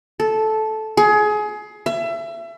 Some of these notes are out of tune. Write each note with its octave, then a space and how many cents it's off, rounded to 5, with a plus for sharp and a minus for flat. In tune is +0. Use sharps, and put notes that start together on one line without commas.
A4 -10
G#4 +25
E5 +30